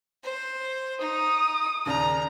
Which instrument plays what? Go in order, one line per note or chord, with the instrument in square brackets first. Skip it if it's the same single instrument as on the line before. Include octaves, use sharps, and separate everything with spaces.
[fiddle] C5
[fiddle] D#4 [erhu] D#6
[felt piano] D#2 C#3 D4 [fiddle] A#5